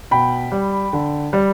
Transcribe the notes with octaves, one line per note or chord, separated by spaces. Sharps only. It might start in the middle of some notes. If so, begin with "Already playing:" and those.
B2 G5 B5
G3
D3
G3